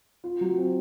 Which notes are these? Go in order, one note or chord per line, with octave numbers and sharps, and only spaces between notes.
F4
F#3
C4